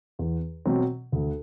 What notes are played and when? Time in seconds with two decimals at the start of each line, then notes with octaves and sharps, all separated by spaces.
0.19 E2
0.66 B2 F#3 C4
1.12 D2